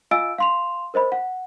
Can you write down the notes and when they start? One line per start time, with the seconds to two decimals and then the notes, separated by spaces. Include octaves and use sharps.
0.11 F4 D#5 F5 G#5 E6 D7
0.38 F5 C6 F7
0.94 A#4 C5 D#5 B5
1.12 F#5